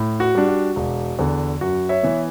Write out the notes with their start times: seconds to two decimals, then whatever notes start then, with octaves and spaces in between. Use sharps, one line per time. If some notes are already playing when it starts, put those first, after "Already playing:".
Already playing: A2
0.20 F#4
0.35 G3 D4
0.48 F#4
0.76 E1
1.19 E2 D3
1.61 F#2 F#4
1.89 C#5 E5
2.03 E3 B3 E4